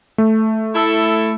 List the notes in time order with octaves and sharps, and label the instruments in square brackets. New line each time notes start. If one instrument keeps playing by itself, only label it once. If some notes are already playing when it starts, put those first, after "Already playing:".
[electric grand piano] A3
[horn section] E4 A4